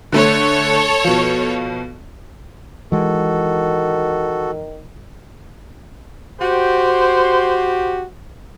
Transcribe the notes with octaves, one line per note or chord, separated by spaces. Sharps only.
D3 A3 A4 C#5
B2 F3
D#3 E3 G#3 F#4 A4
F#4 G4 C5